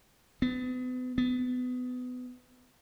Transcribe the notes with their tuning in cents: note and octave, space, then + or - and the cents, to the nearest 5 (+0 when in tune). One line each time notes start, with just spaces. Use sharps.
B3 +35
B3 +25